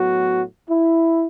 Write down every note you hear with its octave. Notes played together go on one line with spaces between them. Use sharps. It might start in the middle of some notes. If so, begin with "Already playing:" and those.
Already playing: A2 F#3 B3 F#4
E4